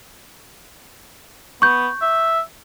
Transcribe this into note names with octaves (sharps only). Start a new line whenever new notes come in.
B3 C#6 G6
E5